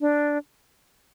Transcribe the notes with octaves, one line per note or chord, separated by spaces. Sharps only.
D4